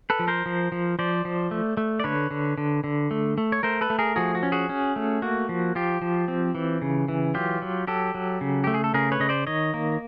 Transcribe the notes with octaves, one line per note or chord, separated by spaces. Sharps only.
A4 B4
F3
A#4 C5
F3
F3
F3 C5 D5
F3
A3
A3
D5
D3 B4 C#5
D3
D3
D3
A3
A3
C#5
A3 A#4 C5
A4 B4
A3
G#4 A#4
F3 F#4 G#4
F#4
C#4
F#4 G#4
C#4
A3
A#3 F#4
F3
F3 F4 G4
F3
C4
E3
C#3
E3
F#3 F4 G4
F#3
F#3 G4 A4
F#3
C#3
A3 G4
G#4
A4
C#3 G#4 A#4
B4 C#5
C#3 D#5
C5 D5
D#3 C#5 D#5
A#3